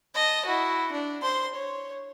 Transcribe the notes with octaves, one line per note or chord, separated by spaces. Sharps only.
D#5 A5
E4 F#4
D4
C5 C6
C#5